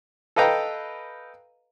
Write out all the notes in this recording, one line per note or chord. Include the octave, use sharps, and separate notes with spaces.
A4 B4 D#5 F5 G5 A#5